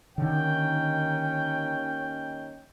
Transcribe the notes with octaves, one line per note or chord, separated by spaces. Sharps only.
D#2 D3 D#3 C#4 D#4 G5